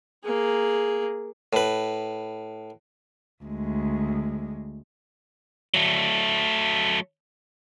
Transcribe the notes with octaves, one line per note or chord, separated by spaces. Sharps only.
A#3 G#4
A2 B4
D2 G#3
F#3 A3